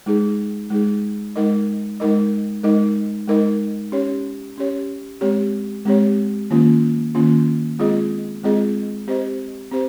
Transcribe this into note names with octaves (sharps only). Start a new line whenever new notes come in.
G#3 D#4 G#4
G#3 D#4 G#4
G#3 D#4 A#4 D#5
G#3 D#4 A#4 D#5
G#3 D#4 A#4 D#5
G#3 D#4 A#4 D#5
C#4 G4 C#5
C#4 G4 C#5
G#3 C4 G4 C#5
G#3 C4 G4 C#5
D#3 A#3 C#4 F4
D#3 A#3 C#4 F4
G#3 C4 F4 G#4 D#5
G#3 C4 F4 G#4 D#5
C4 G4 C5 D#5
C4 G4 C5